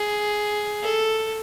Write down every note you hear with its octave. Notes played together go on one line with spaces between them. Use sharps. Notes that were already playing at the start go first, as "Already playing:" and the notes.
Already playing: G#4
A4